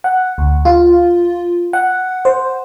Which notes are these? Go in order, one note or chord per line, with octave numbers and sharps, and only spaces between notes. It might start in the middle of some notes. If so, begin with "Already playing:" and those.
F#5
D2
F4
F#5
C5